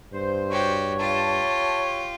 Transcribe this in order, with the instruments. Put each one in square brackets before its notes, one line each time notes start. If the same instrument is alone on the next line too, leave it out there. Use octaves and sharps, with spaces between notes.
[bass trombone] G2 [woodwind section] C5
[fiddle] F#4 G4 [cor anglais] C#5
[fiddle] F4 G4 [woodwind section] A5